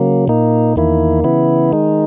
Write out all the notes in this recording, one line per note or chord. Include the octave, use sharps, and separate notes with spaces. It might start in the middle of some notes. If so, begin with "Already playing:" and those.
Already playing: C#3 F#3 A#3
A#2 A#3 D#4
E2 D#3 A#3 E4
C#3 E3 B3 E4
D#3 G#3 D#4